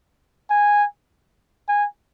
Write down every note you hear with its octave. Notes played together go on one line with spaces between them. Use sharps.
G#5
G#5